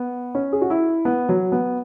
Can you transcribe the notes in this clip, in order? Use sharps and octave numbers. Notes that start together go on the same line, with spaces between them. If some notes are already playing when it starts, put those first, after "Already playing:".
Already playing: B3
C#4
G#4
F#4
E4
B3
F#3
B3